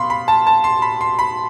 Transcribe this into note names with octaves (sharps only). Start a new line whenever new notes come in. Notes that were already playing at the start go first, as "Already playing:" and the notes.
Already playing: B2 F5 B5 C6
B5
A5
A5
C6
B5
C6
B5